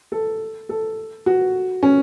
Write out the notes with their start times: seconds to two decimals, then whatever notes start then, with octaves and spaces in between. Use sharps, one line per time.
0.12 A4
0.69 A4
1.26 F#4
1.83 C#4